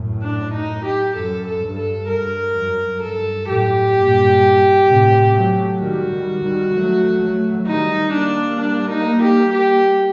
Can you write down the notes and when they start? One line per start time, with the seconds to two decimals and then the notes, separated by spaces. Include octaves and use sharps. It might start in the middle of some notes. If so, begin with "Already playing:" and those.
Already playing: F#2 A2
0.22 D4
0.54 D#4
0.84 G4
1.16 F#2 A4
1.47 A4
1.62 G2
1.78 A4
2.08 G2 A#4
2.55 F#2
3.01 G2 A4
3.48 F#2 A2 G4
3.95 G2 A#2
4.87 A2 C3
5.34 F#3 A3
5.80 D#3 G3 F#4
6.11 D#3 G3
6.43 D#3 G3
6.74 F#3 A3
7.20 F#3 A3
7.67 D#3 G3 D#4
8.13 G3 A#3 D4
8.60 D4
8.91 D#4
9.22 G4
9.53 G4